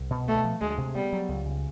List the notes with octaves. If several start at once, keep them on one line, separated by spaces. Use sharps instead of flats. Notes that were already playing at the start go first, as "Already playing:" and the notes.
Already playing: C2
B2
D2 A3
F3
D2 G#3
C3
G3 B3
F#3
C#2
C#3